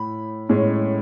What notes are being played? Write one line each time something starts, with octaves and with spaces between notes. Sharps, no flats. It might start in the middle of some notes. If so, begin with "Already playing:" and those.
Already playing: A2 B5
A2 G#3 C#4